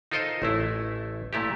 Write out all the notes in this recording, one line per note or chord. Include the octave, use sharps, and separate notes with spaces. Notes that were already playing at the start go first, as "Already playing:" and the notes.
D#4 F4 A4 A#4 C5 D#5
A1 A3 E4
A#2 A3 E4 G4